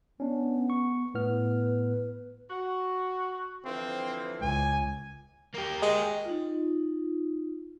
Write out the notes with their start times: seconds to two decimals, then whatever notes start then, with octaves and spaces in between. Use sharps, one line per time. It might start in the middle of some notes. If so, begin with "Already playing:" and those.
0.20 B3 C#4 D4
0.70 C#6
1.15 A2 B3 B4 F6
2.49 F#4
3.65 D3 E3 F3 C4
4.41 C#2 G#5
5.55 A#3 G4
5.82 G#3 D#5
6.25 D#4 F4